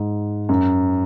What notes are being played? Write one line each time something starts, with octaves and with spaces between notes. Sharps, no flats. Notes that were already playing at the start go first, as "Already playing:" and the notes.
Already playing: G#2
F#2